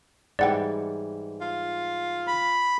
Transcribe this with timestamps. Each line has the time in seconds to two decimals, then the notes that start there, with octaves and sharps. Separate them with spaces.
0.39 G#2 E3 G3 D5 F#5 G5
1.41 F4
2.27 B5